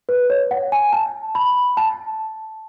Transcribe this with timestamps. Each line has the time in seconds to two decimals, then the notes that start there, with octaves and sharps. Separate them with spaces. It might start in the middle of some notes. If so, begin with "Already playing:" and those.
0.09 B4
0.30 C#5
0.51 F#5
0.72 G#5
0.93 A5
1.35 B5
1.77 A5